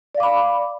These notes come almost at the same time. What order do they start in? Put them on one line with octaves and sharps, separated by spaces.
D5 F5 D6 B5